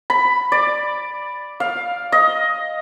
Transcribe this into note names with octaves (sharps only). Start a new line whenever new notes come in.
B5
D5
F5
D#5